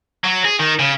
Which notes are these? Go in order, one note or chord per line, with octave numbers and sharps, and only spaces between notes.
F#3
G#4
D#3
C#3